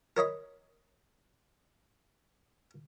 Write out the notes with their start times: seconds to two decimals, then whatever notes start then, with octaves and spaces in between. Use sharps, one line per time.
0.17 A#4 C#5 D#5 B5